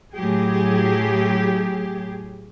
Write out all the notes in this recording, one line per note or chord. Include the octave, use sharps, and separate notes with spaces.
A2 F#3 G4 G#4